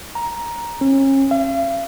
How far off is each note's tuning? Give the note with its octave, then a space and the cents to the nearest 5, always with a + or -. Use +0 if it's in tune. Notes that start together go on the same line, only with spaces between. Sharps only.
A#5 +10
C#4 -35
F5 -45